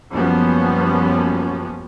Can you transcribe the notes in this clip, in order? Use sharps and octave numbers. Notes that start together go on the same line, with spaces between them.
F#2 F3 G3 A#3 B3 C#4